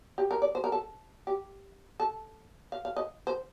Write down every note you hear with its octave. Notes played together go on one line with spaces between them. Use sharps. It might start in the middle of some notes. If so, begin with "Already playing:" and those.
G4
A#4
D5
C5
A#4
A4
G4
A4
F5
F5
D#5
C5